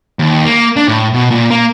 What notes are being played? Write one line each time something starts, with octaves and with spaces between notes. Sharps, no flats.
D#2
A#3
D4
A2
B2
A#2
A#3